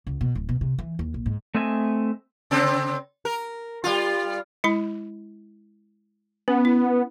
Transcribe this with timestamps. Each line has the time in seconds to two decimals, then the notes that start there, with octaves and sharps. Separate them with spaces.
0.07 C#2
0.21 B2
0.35 D1
0.49 B2
0.61 C3
0.78 E3
0.99 D#2
1.14 A#1
1.26 G#2
1.55 A3 C4 D#5 E5 G#5
2.51 C#3 C4
3.25 A#4
3.84 G3 F4
4.64 G#3 E4 B5
6.48 B3 C#4
6.65 E4